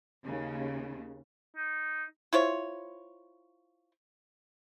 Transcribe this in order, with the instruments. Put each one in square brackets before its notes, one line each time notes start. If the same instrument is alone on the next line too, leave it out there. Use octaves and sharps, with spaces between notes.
[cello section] D#2 C#3
[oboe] D#4
[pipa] E4 F4 C5 C#5